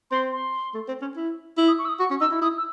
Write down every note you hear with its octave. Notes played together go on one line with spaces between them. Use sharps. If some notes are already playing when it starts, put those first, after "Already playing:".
C4 C6
C6
A3
C4
C#4
E4
E4
D#6
C#6
E6
D#6
F#4 C#6
C#4
D#4 E6
E4
E4 D#6
E6